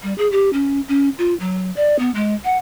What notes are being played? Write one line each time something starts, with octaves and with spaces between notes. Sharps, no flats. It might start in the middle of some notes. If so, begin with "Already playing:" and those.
G3
G#4
G4
C#4
C#4
F4
F#3
D5
B3
G#3
F#5